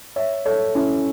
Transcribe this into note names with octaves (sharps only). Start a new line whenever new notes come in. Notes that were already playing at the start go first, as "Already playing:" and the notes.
C#5 E5
A4 C#5
C#4 E4